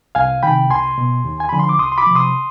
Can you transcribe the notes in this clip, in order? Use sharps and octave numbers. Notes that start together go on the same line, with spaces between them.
C2 F5 G#5
C3 D#3 G5 B5
C2 G#5 C6
B2
D#2
G#5
D3 F3 B5
C6
D6
C2 C6 D#6
C6
B5 D6
C3 F3
C6 D#6